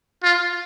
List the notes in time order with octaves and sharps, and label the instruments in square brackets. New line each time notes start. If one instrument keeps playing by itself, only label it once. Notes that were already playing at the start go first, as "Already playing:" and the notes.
[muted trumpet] F4